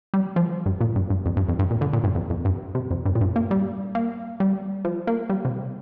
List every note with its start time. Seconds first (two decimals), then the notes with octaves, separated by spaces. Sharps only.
0.14 G3
0.36 F3
0.66 G2
0.81 A#2
0.96 G2
1.10 G2
1.26 F2
1.37 G2
1.49 F2
1.59 G2
1.71 A#2
1.81 D3
1.93 A#2
2.04 G2
2.15 F2
2.30 F2
2.45 G2
2.75 C3
2.91 F2
3.05 G2
3.15 A#2
3.21 G2
3.36 A#3
3.51 G3
3.95 A#3
4.40 G3
4.85 F3
5.07 A#3
5.30 G3
5.45 C3